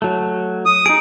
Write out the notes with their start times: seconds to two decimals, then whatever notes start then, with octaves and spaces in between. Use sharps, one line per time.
0.02 F#3 A3
0.66 D#6
0.86 D#4 G#4 D7